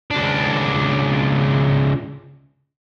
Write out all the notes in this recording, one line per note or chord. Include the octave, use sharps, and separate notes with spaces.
C#2 D4